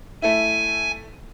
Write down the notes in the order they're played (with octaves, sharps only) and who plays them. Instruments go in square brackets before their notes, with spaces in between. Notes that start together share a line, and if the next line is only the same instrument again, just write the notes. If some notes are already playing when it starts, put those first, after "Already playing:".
[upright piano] A3 E4 [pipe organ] G#5